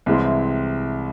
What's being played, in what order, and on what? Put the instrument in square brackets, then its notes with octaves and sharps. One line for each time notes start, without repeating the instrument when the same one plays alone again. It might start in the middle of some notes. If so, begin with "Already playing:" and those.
[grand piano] C2 C3 E3 G#3 C4